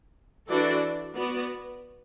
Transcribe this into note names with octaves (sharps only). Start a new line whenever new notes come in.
E3 D4 F#4 A4 D5
B3 F#4 B4 D5